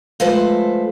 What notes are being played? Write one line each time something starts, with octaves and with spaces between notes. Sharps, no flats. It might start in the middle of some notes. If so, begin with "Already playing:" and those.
F3 G#3 A3 A4 B4 C5